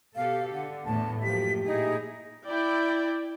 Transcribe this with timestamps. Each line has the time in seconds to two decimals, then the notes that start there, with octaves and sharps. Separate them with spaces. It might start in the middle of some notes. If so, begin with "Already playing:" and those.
0.16 B2 G4 A4 F5
0.53 D3 F#5
0.85 E2 A2 A3 A5
1.23 F#2 F3 A#3 G4 B6
1.66 A#2 D#4 E4 G#4
2.47 E4 D5 G5